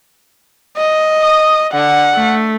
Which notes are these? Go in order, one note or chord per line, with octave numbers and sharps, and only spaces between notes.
D#5
D#6
D3 F#5
A3